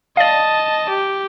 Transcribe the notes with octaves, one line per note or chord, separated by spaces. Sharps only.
D5 D#5 F5 A5
G4